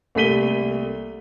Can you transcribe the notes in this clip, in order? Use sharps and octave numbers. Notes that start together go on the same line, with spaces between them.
C2 A3 A#3 B6 D#7 G7